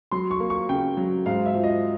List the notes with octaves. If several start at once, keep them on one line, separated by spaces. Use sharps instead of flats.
F#3 C6
C#6
A#3
C#6
C#3 G5
F#3
G#2 F5
E5
F3
D#5